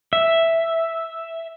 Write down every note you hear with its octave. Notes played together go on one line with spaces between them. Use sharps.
E5